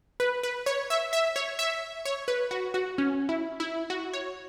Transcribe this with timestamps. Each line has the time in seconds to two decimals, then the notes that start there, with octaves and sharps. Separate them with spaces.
0.20 B4
0.43 B4
0.66 C#5
0.90 E5
1.13 E5
1.36 C#5
1.59 E5
2.05 C#5
2.28 B4
2.51 F#4
2.74 F#4
2.98 C#4
3.29 E4
3.60 E4
3.90 F#4
4.13 C#5